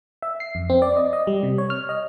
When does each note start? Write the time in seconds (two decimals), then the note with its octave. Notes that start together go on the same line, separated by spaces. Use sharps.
0.22 E5
0.40 C7
0.55 F2
0.70 C4
0.82 D5
0.97 D#5
1.13 D#5
1.27 G3
1.43 C3
1.58 C#5
1.70 F6
1.89 D#5